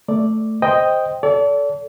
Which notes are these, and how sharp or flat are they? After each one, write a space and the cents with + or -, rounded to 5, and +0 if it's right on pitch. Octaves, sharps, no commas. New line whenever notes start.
A3 +0 D5 +0
C5 +0 D#5 +0 G5 +0
A4 +0 D5 -40